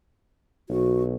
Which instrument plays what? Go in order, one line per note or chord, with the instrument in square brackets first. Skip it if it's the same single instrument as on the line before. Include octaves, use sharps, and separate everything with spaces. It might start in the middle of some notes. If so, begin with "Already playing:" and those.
[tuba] B1 [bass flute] F#4